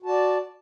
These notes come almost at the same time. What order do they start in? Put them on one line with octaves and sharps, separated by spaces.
F#4 A5 D5